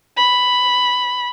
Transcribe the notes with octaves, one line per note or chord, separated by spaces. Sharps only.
B5